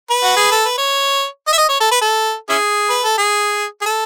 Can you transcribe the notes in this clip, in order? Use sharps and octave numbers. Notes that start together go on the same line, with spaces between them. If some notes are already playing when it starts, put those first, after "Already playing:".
B4
F#4
G#4
A4
B4
C#5
D#5
E5
D#5
C#5
A4
B4
A4
C#4 E4 G#4
B4
A4
G#4
G#4
A4